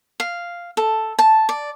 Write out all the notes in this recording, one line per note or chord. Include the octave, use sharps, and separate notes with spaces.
F5
A4
A5
D5